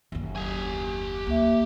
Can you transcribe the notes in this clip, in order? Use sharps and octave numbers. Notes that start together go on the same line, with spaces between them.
F#1 D#2
G4 G#5
D2 A#3 E5